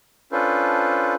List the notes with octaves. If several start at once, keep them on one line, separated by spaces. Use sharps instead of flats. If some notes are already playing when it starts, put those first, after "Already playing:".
C#4 D4 F4 A4 B4 C5